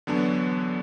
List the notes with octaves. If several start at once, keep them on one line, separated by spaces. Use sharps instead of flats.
E2 D3 F#3 B3 D4